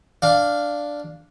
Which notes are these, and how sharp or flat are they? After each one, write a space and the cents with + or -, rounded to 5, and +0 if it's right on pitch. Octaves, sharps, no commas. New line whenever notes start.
D4 +0 F5 +0